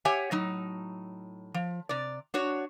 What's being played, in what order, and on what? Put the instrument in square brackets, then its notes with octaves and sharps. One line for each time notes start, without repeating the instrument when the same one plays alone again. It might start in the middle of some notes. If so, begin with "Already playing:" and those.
[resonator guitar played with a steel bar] G4 C#5 E5 F#5 G#5
A2 F#3 D#4
F3
C3 D5
D4 F#4 C#5